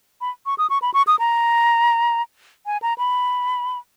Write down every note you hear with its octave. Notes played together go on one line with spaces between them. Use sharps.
B5
C#6
D#6
C#6
B5
C#6
D#6
A#5
G#5
A#5
B5